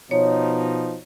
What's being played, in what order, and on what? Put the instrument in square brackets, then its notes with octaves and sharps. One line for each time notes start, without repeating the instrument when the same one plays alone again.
[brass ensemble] B2 F3 D#4 [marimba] C#5